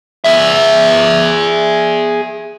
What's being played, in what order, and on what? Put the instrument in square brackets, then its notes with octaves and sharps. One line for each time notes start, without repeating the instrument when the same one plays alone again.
[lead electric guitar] G#4 E5